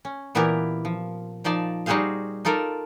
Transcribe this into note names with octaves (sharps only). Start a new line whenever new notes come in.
C#4
A#2 E3 B3 E4 G4 A#4
F3
A#2 F3 D#4 D5 A5
G3 D#4 F#4 G#4 C5 F5
D#4 F4 A4 A#4 D5